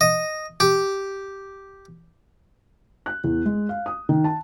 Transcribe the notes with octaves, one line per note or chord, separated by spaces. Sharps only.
D#5
G4
F#6
E2
G#3
F5
D#6
D#3
A5